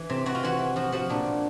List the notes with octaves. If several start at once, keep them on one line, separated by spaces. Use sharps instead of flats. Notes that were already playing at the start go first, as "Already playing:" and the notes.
Already playing: E3
C3
C3 F#4
F4
E3 F#4
E3
F3 F#4
F3 F#4
A#2 D4
A#2